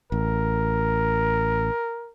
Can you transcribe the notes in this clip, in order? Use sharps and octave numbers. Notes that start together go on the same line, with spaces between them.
A1 A#4